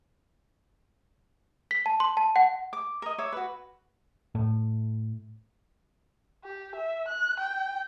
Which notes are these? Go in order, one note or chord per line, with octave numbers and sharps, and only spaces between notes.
B6
A5
C6
A5
F#5
D6
A#4 D#5
C#5 E5 D6
F#4 B4
A2
G4
E5
F#6
G5